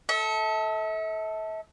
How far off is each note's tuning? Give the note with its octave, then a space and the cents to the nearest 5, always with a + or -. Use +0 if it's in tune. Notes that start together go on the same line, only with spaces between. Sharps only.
A4 +0 E5 -40